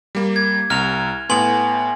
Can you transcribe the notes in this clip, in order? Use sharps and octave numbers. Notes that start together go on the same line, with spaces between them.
G3 A#3
G#6
C2 A#5 F6 F7
A2 B3 G#5 C6 F#7